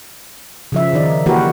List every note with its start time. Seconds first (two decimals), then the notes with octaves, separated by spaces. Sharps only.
0.72 C#3 F3 E5
0.93 D#3 D#4 D5
1.26 E3 A#3 F#4 G4 A#4 B4